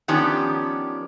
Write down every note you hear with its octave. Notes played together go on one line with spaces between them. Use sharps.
D#3 F3 B3 C#4 D4 G4